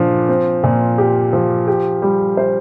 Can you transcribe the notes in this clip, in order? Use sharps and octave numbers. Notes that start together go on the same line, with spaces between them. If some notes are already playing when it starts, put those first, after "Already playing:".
Already playing: A#2 F3 D4
C4
A#2
G4
F3
G4
G3
C5